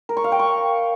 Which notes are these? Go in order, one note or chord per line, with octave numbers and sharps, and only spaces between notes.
A#4
C#6
F5
G5
C#6